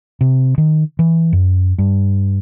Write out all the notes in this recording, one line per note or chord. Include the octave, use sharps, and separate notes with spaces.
C3
D#3
E3
F#2
G2